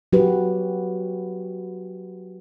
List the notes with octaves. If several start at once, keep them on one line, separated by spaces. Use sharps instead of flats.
F#3 F#4 G4 B4